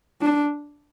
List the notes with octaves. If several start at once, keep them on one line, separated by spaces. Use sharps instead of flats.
D4